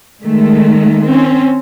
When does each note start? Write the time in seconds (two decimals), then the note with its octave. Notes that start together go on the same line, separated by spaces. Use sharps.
0.23 D#3 G#3 A3
1.08 C4 C#4